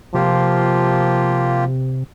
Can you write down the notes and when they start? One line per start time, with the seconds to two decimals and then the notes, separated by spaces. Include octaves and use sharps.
0.14 C3 F3 A#3 F4 G4